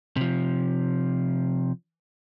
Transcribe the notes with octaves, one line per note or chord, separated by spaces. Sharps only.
C3 F3